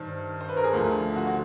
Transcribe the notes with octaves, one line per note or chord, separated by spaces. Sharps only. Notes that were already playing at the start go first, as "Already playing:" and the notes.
Already playing: G2 D#3 C5
C5
B4
A#4
G#4
D2 D3 F3
F#4
F#4